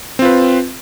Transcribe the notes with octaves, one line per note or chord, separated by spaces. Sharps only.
C4 F4 B4